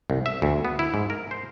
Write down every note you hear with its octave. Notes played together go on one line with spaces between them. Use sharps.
C2
E5
D2
B3
E4
G#2
A#4
C5